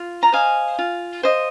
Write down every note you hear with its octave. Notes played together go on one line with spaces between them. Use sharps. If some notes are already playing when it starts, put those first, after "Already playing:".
Already playing: F4
A#5
C5 D#5 F5 G#5
F4
C5 D#5